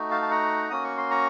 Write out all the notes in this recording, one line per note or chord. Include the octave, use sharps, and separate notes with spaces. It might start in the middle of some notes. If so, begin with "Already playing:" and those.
Already playing: A3 D#4 F#4
F5 A5
A5
F#5 A#5
A#3 C#4 F#4 D#6
C#6
C6
A#5 C#6